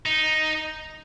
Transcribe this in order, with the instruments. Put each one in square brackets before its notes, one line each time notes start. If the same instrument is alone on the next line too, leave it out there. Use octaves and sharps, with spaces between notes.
[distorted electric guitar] D#4